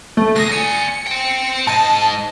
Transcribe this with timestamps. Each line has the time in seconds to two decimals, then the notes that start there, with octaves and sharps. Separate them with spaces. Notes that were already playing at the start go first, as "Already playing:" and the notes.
0.17 A3
0.36 D2 G#4 A#6
0.52 D5 G#5 C#7
1.07 C5 G5
1.67 G#2 D#5 A5